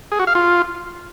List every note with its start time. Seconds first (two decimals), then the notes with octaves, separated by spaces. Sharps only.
0.12 G#4
0.19 F#4
0.27 F5
0.35 F4